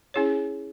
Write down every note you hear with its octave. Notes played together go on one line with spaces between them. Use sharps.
C#4 E4 G#4 C#5